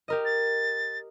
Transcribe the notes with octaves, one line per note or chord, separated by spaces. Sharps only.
G4 A#4 D#5
A6